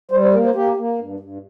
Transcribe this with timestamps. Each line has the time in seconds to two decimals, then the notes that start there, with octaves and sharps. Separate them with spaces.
0.11 G3 C5
0.22 C5
0.33 A#3 A#4
0.45 C5
0.55 A#3 G4
0.77 A#3
0.99 G2
1.20 G2